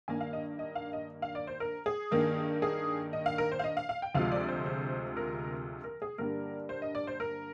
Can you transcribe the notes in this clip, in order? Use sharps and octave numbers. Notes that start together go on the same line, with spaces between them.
G2 D#3 A#3 G#5
F5
D#5
D#5
F5
D#5
F5
D5
C5
A#4
G#4
G2 D#3 A#3
G#4
D#5
F5
A#4
C5
F5
D#5
F5
F5
G5
D2 C3 F3 G#3 F5
D5
C5
C5
A#4
A#4
G#4
G2 D3 G3 A#3 A#4
C5
D#5
D5
C5
A#4